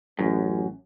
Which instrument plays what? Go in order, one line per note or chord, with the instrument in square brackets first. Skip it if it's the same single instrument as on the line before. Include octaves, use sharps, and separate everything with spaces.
[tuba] A1 [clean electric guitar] F#2